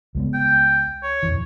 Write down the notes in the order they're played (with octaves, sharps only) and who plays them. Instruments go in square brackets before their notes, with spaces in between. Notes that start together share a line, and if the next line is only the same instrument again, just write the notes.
[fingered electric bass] C#2 G#3 B3
[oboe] G5
C#5
[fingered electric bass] D#1 F2 E3